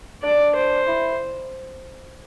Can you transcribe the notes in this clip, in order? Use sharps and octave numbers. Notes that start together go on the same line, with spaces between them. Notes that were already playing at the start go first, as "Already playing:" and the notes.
D4 D5
C5
E4